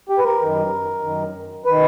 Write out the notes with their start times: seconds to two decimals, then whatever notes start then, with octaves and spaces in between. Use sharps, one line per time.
0.09 G4
0.18 B4
0.25 A#4
0.41 F#2 D#3
1.03 F#2 D#3
1.65 D#3 B4